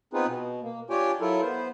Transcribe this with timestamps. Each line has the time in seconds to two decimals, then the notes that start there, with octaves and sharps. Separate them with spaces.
0.14 B3 C4 D#4 F4 G#4 B4
0.27 B2
0.63 A#3
0.90 D4 F4 G4 C#5 G5 G#5
1.21 F#3 E4 F4 A4 A#4
1.41 B3 C5